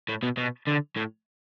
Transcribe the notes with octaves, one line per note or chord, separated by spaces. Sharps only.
A2
B2
B2
D3
A2